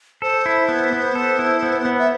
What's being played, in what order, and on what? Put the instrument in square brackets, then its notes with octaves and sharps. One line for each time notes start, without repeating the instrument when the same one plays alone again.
[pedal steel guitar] A4 [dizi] C5
[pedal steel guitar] E4
B3
B3
A4
E4
B3
B3
[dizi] E5